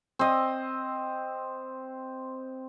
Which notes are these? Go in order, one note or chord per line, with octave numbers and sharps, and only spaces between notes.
C4 D#5